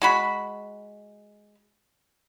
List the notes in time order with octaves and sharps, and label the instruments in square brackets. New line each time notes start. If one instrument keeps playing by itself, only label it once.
[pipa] G#3 F#4 B5